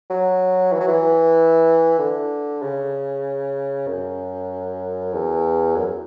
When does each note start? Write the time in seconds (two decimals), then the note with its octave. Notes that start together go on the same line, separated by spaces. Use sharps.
0.10 F#3
0.73 E3
0.80 F#3
0.87 E3
1.98 D3
2.62 C#3
3.87 F#2
5.13 E2
5.76 F#2